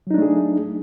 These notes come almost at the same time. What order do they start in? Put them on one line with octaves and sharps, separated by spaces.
F#3 D#4 D4 A3 G#4